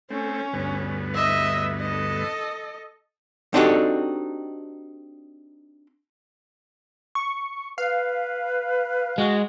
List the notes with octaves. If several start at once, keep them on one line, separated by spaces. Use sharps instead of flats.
A3 C4 C#4
D2 G2 B3
D#5 E5
A4 D#5
C4 D4 D#4 F#4 G4 A4
C#6
B4 F5
G#3 F#4